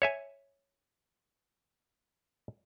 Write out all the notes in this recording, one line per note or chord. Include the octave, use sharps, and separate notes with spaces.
C#5 E5 G#5